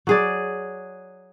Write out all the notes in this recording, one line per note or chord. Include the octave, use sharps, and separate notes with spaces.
F#3 G#4 D5